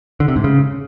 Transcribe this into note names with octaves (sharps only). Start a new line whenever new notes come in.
D3
C3
G#2
C#3